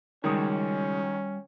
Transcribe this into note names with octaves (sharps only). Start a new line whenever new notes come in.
C#2 D#3 G3 G#3 C#4 F#4 C#5 D#6